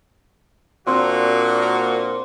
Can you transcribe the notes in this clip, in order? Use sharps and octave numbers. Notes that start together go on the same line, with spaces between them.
A#2 A#3 C4 D4 F#4